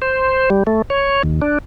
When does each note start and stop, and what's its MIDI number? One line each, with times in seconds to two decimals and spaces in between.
0.02 0.50 72
0.50 0.63 55
0.67 0.82 57
0.90 1.22 73
1.23 1.40 39
1.42 1.58 62